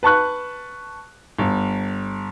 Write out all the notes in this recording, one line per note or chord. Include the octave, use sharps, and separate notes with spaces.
B4 A5 C#6 F#6
G1